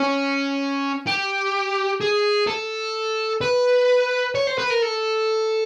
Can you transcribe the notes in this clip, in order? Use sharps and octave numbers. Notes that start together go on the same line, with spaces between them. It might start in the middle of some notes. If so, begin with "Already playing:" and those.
Already playing: C#4
G4
G#4
A4
B4
C#5
C5
B4
A#4
A4